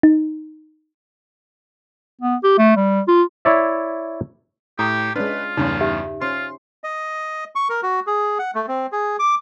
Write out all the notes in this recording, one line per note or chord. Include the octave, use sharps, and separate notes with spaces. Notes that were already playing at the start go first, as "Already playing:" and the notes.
D#4
B3
G4
A3
G3
F4
E4 C#5 D5 E5
A2 G4 A#5 D#6
G#3 C#4 D4 F4 B4
E2 G2 C#3 C#4 D#4 C6
G4 E5
C#4 F4 C5 C6
D#5
C#6
A#4
F#4
G#4
F#5
A3
C4
G#4
D6